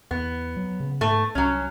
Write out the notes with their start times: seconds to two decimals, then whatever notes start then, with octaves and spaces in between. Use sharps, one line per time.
0.11 E2 B3
0.57 F#3
0.80 C#3
1.01 G#2 A3
1.35 C2 F#3 C#4